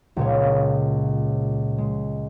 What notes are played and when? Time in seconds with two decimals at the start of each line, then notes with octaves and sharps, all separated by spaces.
0.17 C#2 A#2 C#5
1.78 G#3